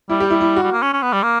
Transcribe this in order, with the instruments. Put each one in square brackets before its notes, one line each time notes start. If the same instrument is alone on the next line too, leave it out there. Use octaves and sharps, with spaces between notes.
[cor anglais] G3 [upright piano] E4
[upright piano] G4
E4
E4
F#4
[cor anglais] G3
A#3
C#4
C#4
B3
G3
A#3